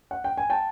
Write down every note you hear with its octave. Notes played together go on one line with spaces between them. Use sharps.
F#5
G5
G#5
G5 A5